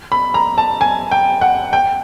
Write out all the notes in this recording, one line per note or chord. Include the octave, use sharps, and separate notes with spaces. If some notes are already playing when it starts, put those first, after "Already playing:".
B5
A#5
A5
G#5
G5
F#5
G5